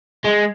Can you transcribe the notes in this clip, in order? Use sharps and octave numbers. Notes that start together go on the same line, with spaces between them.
G#3